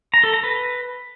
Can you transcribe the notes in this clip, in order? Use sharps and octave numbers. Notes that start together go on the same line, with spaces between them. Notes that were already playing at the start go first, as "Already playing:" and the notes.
A#5
A4
A#5
B4